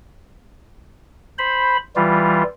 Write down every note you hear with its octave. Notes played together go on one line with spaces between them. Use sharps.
C5 B5
E3 G3 F4